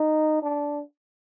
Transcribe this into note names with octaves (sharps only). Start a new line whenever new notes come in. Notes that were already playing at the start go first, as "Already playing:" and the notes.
Already playing: D#4
D4